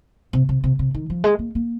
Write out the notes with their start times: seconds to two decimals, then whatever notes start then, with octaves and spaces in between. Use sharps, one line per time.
0.33 C3
0.49 C3
0.64 C3
0.79 C3
0.94 D#3
1.10 F3
1.24 G#3
1.39 A#3
1.55 A#3